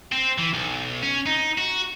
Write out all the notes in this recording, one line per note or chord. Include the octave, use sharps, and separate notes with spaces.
C4
E3
B1
C#4
D#4
F#4